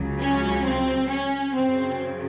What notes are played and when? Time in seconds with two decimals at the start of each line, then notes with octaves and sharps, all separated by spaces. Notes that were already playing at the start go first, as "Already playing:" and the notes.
Already playing: C#2 C#3 F#3
0.19 C#4
0.64 C4
1.09 C#4
1.53 F#2 C#3 F#3 C4